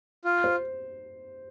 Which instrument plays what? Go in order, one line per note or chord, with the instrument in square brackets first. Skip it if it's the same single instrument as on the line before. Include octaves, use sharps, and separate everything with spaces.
[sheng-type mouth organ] F4
[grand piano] C5